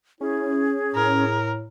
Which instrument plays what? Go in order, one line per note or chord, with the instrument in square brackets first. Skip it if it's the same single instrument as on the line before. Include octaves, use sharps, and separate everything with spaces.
[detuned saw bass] C#4 [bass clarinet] E4 [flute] G#4
[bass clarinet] A2 [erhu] A#4